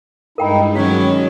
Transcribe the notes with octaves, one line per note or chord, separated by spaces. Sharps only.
G2 G#3 D#4 E4 A#4 G5 B5
D#3 F#3 C#4 F#4 C#5